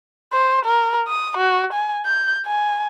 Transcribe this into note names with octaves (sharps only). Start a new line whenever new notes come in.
C5
A#4
D#6
F#4
G#5
G6
G#5